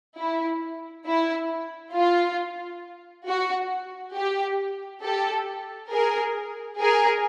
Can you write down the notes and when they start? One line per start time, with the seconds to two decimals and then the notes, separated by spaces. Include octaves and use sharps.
0.16 E4
1.05 E4
1.94 F4
3.26 F#4
4.15 G4
5.03 G4 A4
5.91 G#4 A#4
6.79 G#4 A#4